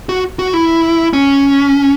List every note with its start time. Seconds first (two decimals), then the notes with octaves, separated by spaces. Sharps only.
0.09 F#4
0.39 F#4
0.54 E4
1.13 C#4